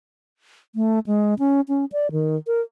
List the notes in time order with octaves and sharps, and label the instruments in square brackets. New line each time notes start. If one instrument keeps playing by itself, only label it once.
[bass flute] A3
G#3
C#4
C#4
D5
D#3
A#4